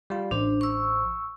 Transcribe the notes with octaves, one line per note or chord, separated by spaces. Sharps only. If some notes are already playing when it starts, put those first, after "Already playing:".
G3 F4
A1 D4 C5
C#6 E6